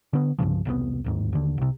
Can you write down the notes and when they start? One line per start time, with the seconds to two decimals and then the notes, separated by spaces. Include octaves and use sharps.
0.13 D3 B3
0.39 C2 G2 C#3 F3
0.65 E1 C2 C3 B3
1.04 D1 D#2 G#2
1.33 D#2 D3
1.58 C2 C3